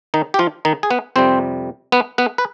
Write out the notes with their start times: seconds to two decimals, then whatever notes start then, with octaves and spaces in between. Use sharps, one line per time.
0.14 D#3 D#4
0.34 G4
0.39 F3 F4
0.65 D#3 D#4
0.83 G#4
0.91 B3 B4
1.16 F2 C3 G3 C4 C5
1.92 B3 B4
2.18 B3 B4
2.38 B4